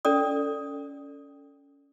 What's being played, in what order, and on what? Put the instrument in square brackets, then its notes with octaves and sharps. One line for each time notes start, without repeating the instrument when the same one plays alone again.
[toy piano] C#4 A4 D5 D#6